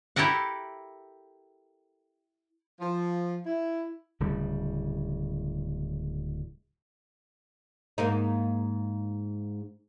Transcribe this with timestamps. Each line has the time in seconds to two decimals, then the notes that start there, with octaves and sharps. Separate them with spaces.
0.16 E4 G4 A4 A#4 F#5
2.81 F3
3.46 E4
4.20 D1 C#3 G3
7.98 G#2 A#3 D#4